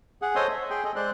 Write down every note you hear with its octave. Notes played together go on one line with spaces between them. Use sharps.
G#4 F#5
A4 C5 C#5 D#5 C6 D#6
E5
G#4 G5 C6
G#4 A4 D#5
G#3 C5 D5 C6 F#6